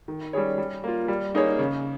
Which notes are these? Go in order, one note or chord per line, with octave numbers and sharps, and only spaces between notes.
D#3
G3 C#4 G#4 C#5
G3
A#3 F4
G3
A#3 D#4 G#4 C#5
C#3